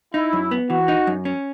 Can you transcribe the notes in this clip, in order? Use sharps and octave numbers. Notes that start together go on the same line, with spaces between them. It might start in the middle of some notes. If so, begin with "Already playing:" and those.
D#4 E4
F#2
B3
E3 F#4
D#4
F#2
C#4